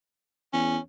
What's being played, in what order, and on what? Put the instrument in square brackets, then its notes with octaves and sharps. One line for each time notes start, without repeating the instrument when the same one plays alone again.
[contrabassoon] E2 [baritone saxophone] C#4